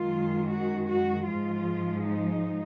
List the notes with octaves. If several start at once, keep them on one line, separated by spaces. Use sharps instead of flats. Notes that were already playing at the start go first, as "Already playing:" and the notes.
Already playing: F#2 D#3 G#3 F4
F#4
F#4
G#2 F3 G#3 F4
D#4